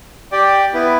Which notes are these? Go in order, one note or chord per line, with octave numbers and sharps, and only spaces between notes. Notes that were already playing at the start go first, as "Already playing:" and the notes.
G4 D5 G5
B3 E4 B4